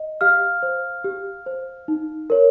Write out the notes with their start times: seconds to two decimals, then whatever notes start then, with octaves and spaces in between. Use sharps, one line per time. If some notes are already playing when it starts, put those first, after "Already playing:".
Already playing: D#5
0.21 G4 F5 F6
0.63 C5
1.04 G4
1.46 C5
1.88 D#4
2.30 A#4 C#5